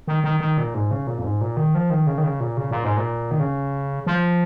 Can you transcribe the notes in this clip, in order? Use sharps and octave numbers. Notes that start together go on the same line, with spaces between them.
D#3
D#3
D#3
A#2
G#2
C#3
A#2
F2
G#2
A#2
D#3
F3
D#3
C#3
D#3
C#3
A#2
C#3
A#2
G#2
A#2
D#3
C#3
F3